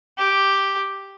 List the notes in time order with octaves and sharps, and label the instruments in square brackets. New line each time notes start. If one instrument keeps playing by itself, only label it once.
[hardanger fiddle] G4